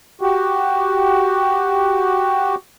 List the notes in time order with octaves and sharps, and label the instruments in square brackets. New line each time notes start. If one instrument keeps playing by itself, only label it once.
[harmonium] F#4 G4